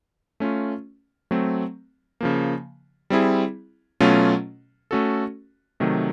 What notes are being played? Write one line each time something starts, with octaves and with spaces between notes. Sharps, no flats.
A3 C#4 F4
F#3 A3 C4
C#3 F3 A#3
G3 C4 E4 G#4
B2 F#3 A3 C#4 F4
A3 C#4 F#4 A4
C3 D#3 F#3 A3